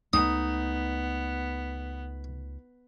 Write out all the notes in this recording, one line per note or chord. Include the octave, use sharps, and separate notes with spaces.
C#2 A3 B3 D#4 D#6